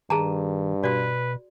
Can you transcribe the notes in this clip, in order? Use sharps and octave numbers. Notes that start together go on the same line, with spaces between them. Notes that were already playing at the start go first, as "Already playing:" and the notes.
G2 D#3 G#4 A5 A#5
B2 F#4 B4 D5